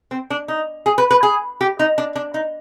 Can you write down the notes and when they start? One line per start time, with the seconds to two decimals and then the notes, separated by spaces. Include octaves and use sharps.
0.11 C4
0.30 D4
0.48 D#4
0.86 G#4
0.98 B4
1.11 B4
1.23 G#4
1.61 G4
1.79 D#4
1.98 D4
2.16 D4
2.34 D#4